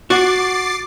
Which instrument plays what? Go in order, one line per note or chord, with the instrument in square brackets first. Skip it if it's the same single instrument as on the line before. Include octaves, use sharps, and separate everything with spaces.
[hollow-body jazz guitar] F#4 [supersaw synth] D6 A6 C7